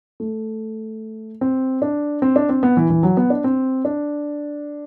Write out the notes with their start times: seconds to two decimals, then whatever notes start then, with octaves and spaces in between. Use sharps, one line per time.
0.20 A3
1.41 C4
1.82 D4
2.22 C4
2.36 D4
2.49 C4
2.63 B3
2.77 E3
2.90 E3
3.03 F#3
3.17 B3
3.30 D4
3.44 C4
3.85 D4